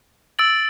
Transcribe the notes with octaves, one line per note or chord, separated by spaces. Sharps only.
E6 A6 D7 F#7